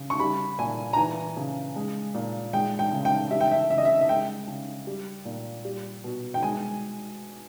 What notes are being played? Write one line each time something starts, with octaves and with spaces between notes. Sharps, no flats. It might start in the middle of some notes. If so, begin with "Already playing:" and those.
Already playing: C#3
C#6
G3 B5
A#2 G#5
A#5
E3 G#5
C#3
G#3
A#2
G#3 G5
G5
C#3
G5
G3 E5
G5
E5
C#3 E5
D#5
E5
E5
G#3 G5
C#3
G3
A#2
G3
B2
G5
G#3 G#5